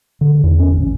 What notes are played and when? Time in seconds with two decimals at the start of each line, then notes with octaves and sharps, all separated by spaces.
0.21 D3
0.43 E2
0.59 C#4
0.71 A1
0.83 A1